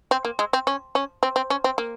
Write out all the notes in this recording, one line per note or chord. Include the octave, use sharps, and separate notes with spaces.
C4
A#3
G#3
C4
C#4
C#4
C4
C4
C#4
C4
A#3